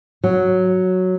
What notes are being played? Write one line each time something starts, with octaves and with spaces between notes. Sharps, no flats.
F#3